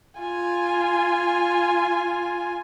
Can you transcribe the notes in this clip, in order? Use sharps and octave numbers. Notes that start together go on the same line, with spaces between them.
F4 G#5